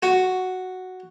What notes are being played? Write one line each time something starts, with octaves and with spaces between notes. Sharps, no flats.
F#4